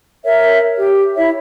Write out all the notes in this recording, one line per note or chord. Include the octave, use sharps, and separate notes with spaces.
A#4 C#5 E5
G4
E4 C#5 E5